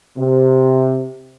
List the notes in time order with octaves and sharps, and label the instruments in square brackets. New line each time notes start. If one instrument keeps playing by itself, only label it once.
[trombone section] C3